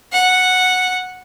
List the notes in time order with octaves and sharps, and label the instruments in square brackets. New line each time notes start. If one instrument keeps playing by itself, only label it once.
[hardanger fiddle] F#5